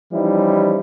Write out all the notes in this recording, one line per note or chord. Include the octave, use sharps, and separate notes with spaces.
E3 F3 G3 C#4 D#4 E4